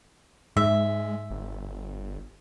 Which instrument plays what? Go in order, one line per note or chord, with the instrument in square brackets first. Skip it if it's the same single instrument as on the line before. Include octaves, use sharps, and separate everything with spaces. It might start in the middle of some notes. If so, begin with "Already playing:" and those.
[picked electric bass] G#2 [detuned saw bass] G#3 [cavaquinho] E5
[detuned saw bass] G1